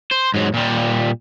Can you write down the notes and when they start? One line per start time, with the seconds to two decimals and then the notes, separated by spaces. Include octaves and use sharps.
0.11 C5
0.34 G#2 F#3
0.54 A#2 G3